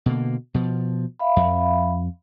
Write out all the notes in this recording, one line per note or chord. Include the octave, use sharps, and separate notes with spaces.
B2 D3 A#3
B2 F3
E5 F5 B5
F2